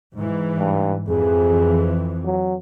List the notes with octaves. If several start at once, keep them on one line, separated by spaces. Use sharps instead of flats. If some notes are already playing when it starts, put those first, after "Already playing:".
G#2 E3
G2
F2 E3 G#4
F#3